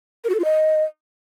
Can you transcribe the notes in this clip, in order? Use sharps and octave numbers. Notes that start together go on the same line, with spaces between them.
A#4
F#4
A4
F4
D#5